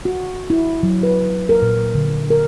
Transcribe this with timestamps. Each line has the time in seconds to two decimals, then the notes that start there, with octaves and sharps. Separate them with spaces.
0.05 F#4
0.50 E4
0.83 F#3
1.03 B4
1.49 A#4
1.62 A#2
1.95 D3
2.31 A#4